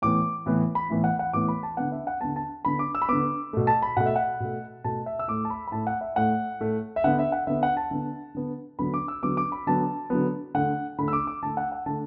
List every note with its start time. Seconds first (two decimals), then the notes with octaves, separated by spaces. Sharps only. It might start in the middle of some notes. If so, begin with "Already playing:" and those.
0.02 A2 E3 B3 D6
0.46 A2 E3 B3
0.75 B5
0.90 A2 E3 B3
1.04 F#5
1.19 F#5
1.33 A2 E3 B3 D6
1.48 B5
1.63 A5
1.77 D3 B3 F#5
1.92 E5
2.07 F#5
2.21 D3 B3 A5
2.36 A5
2.65 D3 B3 B5
2.79 D6
2.95 E6
3.02 B5
3.08 D3 B3 D6
3.53 B2 A3
3.67 A5
3.82 B5
3.97 B2 A3 F#5
4.06 E5
4.16 F#5
4.40 B2 A3
4.84 B2 A3 A5
5.06 E5
5.19 E6
5.28 A2 A3 D6
5.45 A5
5.50 B5
5.67 B5
5.72 A2 A3 A5
5.87 F#5
6.01 E5
6.16 A2 A3 F#5
6.60 A2 A3
6.96 E5
7.04 D3 B3 F#5
7.19 E5
7.32 F#5
7.47 D3 B3 E5
7.63 F#5
7.77 A5
7.91 D3 B3
8.35 D3 B3
8.79 D3 F#3 B3 B5
8.94 D6
9.08 E6
9.22 D3 F#3 B3 D6
9.37 D6
9.52 B5
9.67 D3 F#3 B3 A5
10.10 D3 F#3 B3
10.54 D3 A3 F#5
10.98 D3 A3 B5
11.08 E6
11.13 D6
11.27 D6
11.42 D3 A3 A5
11.57 F#5
11.72 F#5
11.86 D3 A3 A5